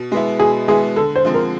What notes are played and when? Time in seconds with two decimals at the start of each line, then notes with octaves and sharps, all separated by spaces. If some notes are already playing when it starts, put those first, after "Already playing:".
Already playing: B2
0.12 G#3 B3 E4
0.39 B2 G#4
0.68 G#3 B3 E4 G#4
0.96 D3 A4
1.16 C5
1.25 F3 G#3 C4
1.34 A#4